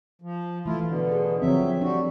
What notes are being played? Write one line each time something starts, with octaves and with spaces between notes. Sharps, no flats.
F3
E3 A3 E4 F4
B2 D3
G#4
D3 F3 F#3 C4 E5
G3 D4 F#4